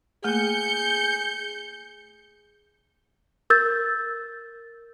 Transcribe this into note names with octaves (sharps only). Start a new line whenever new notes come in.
A3 A#3 G#4 G6 C#7
A#4 E6 G6 A6